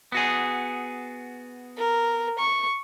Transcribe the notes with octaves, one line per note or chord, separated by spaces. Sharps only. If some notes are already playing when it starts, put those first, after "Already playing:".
B3 F#4 G#4
A#4
C#6